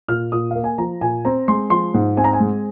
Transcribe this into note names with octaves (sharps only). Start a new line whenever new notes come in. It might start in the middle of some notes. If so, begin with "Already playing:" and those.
A#2 F6
A#2 D#6
A#3 F5
G#5
F3 A#5
A#2 G#5
C4 A#5
G#3 C6
F3 C6
G#2
C4 G#5
A#5
G#5
G#3